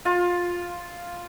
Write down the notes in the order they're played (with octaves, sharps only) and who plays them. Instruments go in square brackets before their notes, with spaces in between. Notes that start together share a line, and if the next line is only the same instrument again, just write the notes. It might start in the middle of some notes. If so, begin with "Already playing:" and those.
[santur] F4